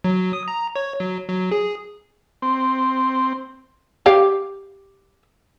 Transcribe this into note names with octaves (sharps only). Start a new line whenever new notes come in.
F#3
D#6
A#5
C#5
F#3
F#3
G#4
C4
G4 F5